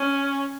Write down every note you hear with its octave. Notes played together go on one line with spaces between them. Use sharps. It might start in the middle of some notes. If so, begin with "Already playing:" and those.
Already playing: C#4